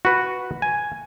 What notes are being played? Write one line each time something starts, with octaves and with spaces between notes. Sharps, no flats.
F#4 B4
G#5